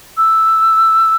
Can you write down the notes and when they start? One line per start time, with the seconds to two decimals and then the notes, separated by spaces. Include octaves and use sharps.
0.17 E6